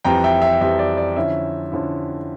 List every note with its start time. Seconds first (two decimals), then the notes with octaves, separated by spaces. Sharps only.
0.04 F2 E3 G3 G5 A#5
0.24 E5 G5
0.42 E5
0.61 F2 E3 G3 E5
0.79 D5
0.97 D5
1.16 D3 F3 C#4 E4 E5
1.72 D3 F3 C#4 E4